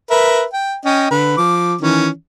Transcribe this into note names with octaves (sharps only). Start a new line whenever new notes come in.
A#4 B4 E5
G5
C#4 D#5 G5
D3 B4
F3 D6
D#3 E3 C#4